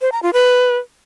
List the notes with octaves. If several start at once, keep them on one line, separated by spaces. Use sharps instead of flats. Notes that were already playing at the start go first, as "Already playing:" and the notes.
C5
A#5
F4
B4